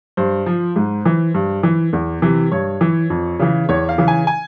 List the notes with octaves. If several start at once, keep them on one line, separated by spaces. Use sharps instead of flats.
G2 C5
F3
G#2
E3
G2
E3
E2
C3 E3
G2 C#5
E3
F2
C#3 E3
E2 C#5
F5
C#3 E3
G#5
G#5